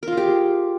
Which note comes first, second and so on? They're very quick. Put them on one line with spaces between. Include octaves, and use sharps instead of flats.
A#4 F4 G#4 G4